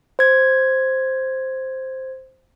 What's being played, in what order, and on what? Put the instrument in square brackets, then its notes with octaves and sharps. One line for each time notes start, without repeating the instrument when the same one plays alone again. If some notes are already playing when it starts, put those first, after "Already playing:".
[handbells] C5 G#6